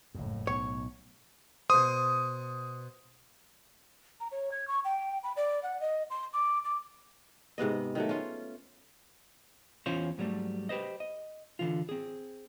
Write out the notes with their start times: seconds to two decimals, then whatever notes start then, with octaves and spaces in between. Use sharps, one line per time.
0.14 F#1 F2 A2
0.47 B1 C#5
1.70 B2 C5 D#6
4.20 A#5
4.32 C#5
4.51 G#6
4.68 C#6
4.84 G5
5.23 B5
5.36 D5
5.63 F#5
5.81 D#5
6.10 C6
6.33 D6
6.64 D6
7.58 G#2 C3 B3 D#5
7.95 D#3 F#3 A3
8.09 C#4 F4
9.86 E2 E3 C#4 F4 C5 C#5
10.18 G#2 F#3 G3 A3
10.69 G4 B4 C5 D#5
11.00 D#5
11.59 D3 E3 F4
11.89 C4 G#4